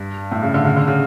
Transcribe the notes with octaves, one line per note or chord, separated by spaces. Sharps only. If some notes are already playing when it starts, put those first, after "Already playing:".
Already playing: G2
A2
C#3
D3
C#3
D3
C#3